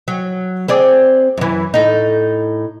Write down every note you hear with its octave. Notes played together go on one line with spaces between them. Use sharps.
F#3
C4 G#4 D5
F#2 E3
A2 D#4